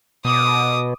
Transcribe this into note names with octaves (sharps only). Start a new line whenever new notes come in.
B2 D6 D#6